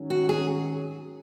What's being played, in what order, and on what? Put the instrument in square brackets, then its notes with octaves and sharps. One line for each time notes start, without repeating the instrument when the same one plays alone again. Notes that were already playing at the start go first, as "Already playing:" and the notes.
Already playing: [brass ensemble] G#2 D#3 F#3 C#4
[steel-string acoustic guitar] F#4
G#4